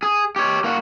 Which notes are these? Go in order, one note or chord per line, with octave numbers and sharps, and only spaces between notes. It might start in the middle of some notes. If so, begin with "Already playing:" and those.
G#4
G4 C#5
A#3 F#4